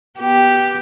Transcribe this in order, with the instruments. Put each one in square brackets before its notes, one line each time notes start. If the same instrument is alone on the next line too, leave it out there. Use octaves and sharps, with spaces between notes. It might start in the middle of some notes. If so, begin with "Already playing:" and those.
[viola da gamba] B3 G4